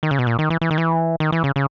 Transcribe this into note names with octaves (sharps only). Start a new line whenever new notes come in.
D#3
C#3
B2
A#2
D#3
E3
E3
D#3
E3
D#3
E3
C#3
C#3